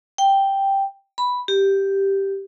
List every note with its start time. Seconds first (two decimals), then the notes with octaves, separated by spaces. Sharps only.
0.18 G5
1.18 B5
1.48 G4